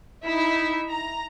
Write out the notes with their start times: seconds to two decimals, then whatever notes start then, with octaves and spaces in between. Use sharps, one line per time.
0.25 D#4 E4 E5
0.88 A#5